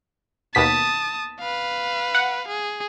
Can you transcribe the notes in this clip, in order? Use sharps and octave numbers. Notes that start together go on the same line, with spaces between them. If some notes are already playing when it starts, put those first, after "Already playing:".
D#2 B2 A5 D#6 B6
B4 F5
F#5
G#4